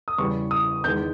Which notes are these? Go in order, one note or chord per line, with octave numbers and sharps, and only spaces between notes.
D#6
E2 C#3 E3 G3 C#6
D#6
E2 D#3 G#3 G6